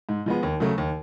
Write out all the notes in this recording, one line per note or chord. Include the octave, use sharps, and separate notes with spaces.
G#2
F3 G#3 B3
D#2
C#3 F#3 A3
D#2